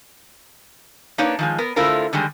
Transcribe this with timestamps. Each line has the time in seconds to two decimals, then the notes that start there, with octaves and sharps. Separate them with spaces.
1.18 A#3 D4 D#4 B4 C#5
1.39 D#3 F3 G#3
1.58 B3 A#4
1.76 D3 A3 E4 F4 A#4 C5
2.13 D3 D#3 G3 G#3